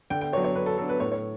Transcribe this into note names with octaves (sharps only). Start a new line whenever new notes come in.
D3 G5
G5
F#3 B3 D4 C#5
C#5
D3 B4
A4
F#3 B3 D4 A4
B4
A2 C#5
C#5